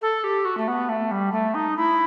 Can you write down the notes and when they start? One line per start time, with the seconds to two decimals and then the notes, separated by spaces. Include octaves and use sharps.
0.02 A4
0.24 G4
0.45 F#4
0.57 A3
0.68 B3
0.89 A3
1.11 G3
1.32 A3
1.54 D#4
1.77 E4